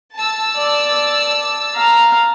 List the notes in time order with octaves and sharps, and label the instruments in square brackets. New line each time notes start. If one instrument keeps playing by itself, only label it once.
[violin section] A5 E6
[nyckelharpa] D5
F5 A#5